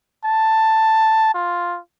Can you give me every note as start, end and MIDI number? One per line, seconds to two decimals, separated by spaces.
0.24 1.31 81
1.34 1.79 65